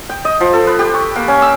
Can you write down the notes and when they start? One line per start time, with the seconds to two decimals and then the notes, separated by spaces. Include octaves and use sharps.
0.09 G5
0.25 D#5
0.41 F3
0.53 A4
0.67 B4
0.79 G4
0.94 C#6
1.16 A#3
1.28 C#4
1.42 E6